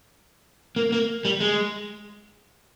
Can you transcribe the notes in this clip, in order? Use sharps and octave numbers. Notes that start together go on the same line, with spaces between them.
A#3
A#3
G3
G#3